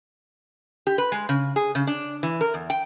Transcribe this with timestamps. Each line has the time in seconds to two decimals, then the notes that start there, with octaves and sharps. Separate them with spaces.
0.87 G4
0.98 B4
1.12 G#3
1.29 C#3
1.56 G#4
1.75 C#3
1.87 D4
2.23 E3
2.41 A#4
2.54 E2
2.70 G5